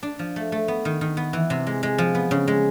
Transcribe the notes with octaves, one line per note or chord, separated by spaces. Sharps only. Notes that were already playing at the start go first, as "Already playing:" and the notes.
D4
F3
A3
A3
B3
D#3
D#3
B3
E3
C3
G#3
G#3
F3
B3
C#3
G#3